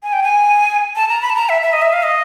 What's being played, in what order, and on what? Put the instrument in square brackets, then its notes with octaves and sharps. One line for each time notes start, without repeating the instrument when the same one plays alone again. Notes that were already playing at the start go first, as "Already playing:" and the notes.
[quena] G#5
G5
G#5
A5
A#5
B5
A5
A#5
E5
E5
D#5
E5
F5
D#5